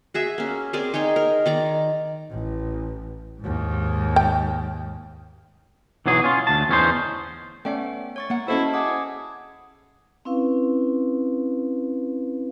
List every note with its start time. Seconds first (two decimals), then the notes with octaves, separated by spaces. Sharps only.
0.14 F#4 G#4 E5
0.38 A#3 C#4
0.73 C4 G#4 A#4 D5
0.94 D#4 G#4 C#5 G5
1.16 A#4
1.46 D#3 D5 A#5
2.31 A1
3.40 D#2 G#2
4.16 G5
6.06 B1 E3 F#3 G#4
6.24 C#4 F4
6.47 D2 A5
6.69 E2 C#4 D#4 C5
7.65 A3 B3 C#4 D5 E5 G5
8.16 C#5 C#6 A6
8.30 A#3 F#5
8.48 C#4 E4 F#4 A4 C5 D#5 A5
8.74 G#4 F#5 D6
10.25 C4 C#4 E4 B4 F5